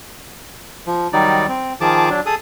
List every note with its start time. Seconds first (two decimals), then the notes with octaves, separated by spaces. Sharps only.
0.87 F3
1.13 D#3 F#3 G3 D#4 D5
1.48 C4
1.81 D#3 F3 G#4 A5 D6
2.10 F#3 D4
2.26 G#4 A4 D#6